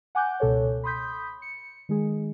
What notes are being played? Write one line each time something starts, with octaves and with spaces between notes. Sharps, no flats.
F#5 G#5 D6 F#6 G6
C#2 B2 A4 C#5
B5 C6 D#6 G6 B6
C#7
D#3 G#3 G#4